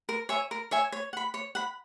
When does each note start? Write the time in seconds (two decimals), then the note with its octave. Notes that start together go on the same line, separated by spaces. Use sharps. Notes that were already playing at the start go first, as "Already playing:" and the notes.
0.09 A#4
0.29 C#5 E5 G#5
0.51 A#4
0.71 C#5 E5 G#5
0.92 C#5
1.13 F#5 B5
1.34 C#5
1.55 F#5 B5